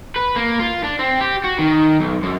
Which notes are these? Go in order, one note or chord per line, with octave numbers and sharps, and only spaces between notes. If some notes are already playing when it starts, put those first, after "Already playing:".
B4
A#3
F4
D4
C4
G4
F#4
D#3
B1
F#2